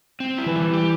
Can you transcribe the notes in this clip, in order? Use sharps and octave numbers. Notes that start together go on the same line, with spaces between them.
C4
E4
E3
G3
G4